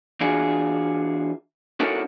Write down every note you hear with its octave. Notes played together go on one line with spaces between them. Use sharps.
E3 D4 F4 F#4 G#4
C#4 D#4 E4 F#4 A4 A#4